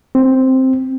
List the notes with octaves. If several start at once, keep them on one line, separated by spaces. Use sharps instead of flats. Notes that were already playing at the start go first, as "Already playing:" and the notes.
C4